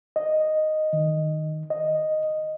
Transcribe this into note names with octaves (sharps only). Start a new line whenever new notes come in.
D#5
D#3
D#5